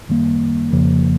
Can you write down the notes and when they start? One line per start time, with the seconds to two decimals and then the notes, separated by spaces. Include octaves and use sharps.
0.09 F#2 D#3 G3 A#3
0.72 F2 C#3 F3 A#3